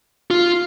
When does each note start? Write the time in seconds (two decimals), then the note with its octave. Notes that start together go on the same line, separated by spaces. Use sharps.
0.30 F4